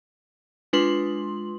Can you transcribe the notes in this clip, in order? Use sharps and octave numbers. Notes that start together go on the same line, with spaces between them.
G#3 D4 F4 B4 C6 F#7